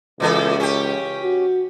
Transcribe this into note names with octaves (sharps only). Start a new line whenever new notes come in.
C#2 A#2 E3 A4
C#4 G4
F#4